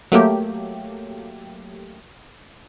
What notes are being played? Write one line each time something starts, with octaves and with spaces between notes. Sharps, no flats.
F#3 A3 A#3 G4